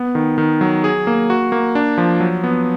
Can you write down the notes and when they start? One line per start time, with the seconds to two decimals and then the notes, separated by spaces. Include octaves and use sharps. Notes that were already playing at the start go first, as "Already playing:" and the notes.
Already playing: B3
0.15 D#3
0.38 D#3
0.61 F#3
0.84 G#4
1.07 A#3
1.30 F#4
1.52 A#3
1.75 D4
1.98 F3
2.20 F#3
2.44 B3